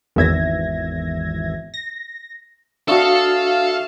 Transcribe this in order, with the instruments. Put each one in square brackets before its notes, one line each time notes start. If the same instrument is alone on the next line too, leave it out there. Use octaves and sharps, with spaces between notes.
[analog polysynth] G#1 E2 E5 G#6 A#6
A#6
[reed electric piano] D4 F#4 [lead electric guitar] A4 A5 [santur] E5 C#6 D#6 [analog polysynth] F5